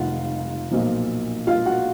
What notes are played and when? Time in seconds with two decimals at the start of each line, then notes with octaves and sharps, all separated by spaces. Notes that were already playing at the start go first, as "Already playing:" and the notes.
Already playing: F1 D#3 F4 F5 F#5
0.71 B1 A#2 F3
1.47 F4 F5
1.66 F#4 F#5